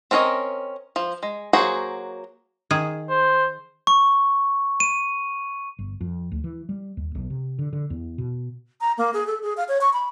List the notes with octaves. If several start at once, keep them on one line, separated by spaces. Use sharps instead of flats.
C4 C#4 A#4 C#5 D#5
F3
G#3
F#3 A#3 F#4 G#4 C5
D#3 G#4
C5
C#6
D#7
G1
F2
D2
E3
G3
D#2
B1
C3
D3
D3
E2
B2
A#5
A#3
G#4
A4
G#4
F5
C#5
C#6
B5